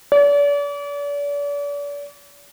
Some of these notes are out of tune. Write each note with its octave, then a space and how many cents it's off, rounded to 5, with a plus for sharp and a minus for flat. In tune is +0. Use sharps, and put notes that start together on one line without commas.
D5 -40